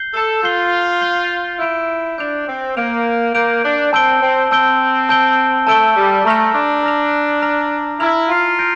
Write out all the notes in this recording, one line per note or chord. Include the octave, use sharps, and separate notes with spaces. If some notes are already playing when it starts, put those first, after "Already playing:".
Already playing: G6 C7 G7
A4
F4 G6 C7 G7
G6 C7 G7
E4 G6 D7 F7
D4 G6 D7 F7
C4
A#3 G6 D7 F7
A#3 G6 D7 F7
D4
C4 A5 E6 G6 D7 G7
C4
C4 A5 E6 G6 D7 G7
A5 E6 G6 D7 G7
A3 A5 E6 G6 D7 G7
G3
A3 A#5 F6 A#6 F7
D4
A#5 F6 A#6 F7
A#5 F6 A#6 F7
E4 A#5 F6 A#6 F7
F4
G6 A#6 D7